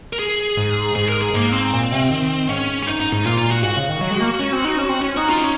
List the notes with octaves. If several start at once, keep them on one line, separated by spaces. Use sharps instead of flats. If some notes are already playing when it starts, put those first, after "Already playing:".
A#4
G#4
G#2
G#2 G#4
A#4
G#4
G#2 A#3
C4
A#2
C3
D#3
G#2 C#4
C#4
F#2 D#4
G#2 D#4
G#2 D#4
A#2 F4
F4
F#4
G#2 F#4
C#3
D#3
F#3
G#3
A#3
C#4
C4
D#4
C#4
C4
C#4
D#4 F#4
F4
C4
C#4